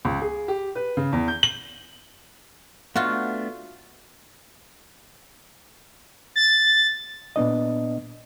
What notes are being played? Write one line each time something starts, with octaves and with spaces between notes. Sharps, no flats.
C#2
G#4
G4
B4
C#3
E2
G6
F#7
A3 B3 D4 F4 F#4
A6
A#2 B3 D4 D#5